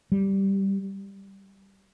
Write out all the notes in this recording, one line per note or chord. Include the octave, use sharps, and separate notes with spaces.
G3